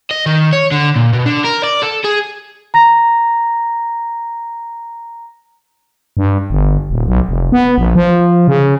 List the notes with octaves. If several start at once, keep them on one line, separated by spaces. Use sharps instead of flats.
D#5
D#3
C#5
D3
A#2
B2
D3
A#4
D5
A4
G#4
A#5 A#6
G2
G1
D#1
B1
F1
B3
A#1
F3
C#3